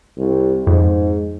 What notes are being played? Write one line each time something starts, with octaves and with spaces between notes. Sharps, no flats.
C2
F2 G#2